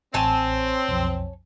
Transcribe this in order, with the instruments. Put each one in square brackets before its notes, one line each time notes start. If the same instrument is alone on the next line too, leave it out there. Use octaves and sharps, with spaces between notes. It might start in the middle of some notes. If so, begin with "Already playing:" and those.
[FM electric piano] A1 [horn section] C4 [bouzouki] C#5 G#5 A5
[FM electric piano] B1 F2